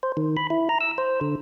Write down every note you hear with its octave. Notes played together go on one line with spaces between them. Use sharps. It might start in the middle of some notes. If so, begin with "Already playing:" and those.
C5
D#3
B5
E4
A#5
E6
C5
D3